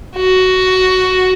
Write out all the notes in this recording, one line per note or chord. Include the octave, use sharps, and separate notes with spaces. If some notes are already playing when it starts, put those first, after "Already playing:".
F#4